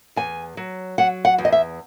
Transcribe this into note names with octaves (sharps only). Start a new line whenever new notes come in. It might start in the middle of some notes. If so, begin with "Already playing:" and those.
E2 G#5
F#3
F#3 F#5
F#5
E2
D#5
E5